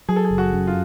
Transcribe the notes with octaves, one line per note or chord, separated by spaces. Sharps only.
F#3 G#4
A4
G#4
F#1
F#4
F#2
F4